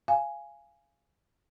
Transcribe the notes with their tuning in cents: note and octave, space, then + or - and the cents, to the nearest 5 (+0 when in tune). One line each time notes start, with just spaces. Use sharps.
F5 -20 G#5 +0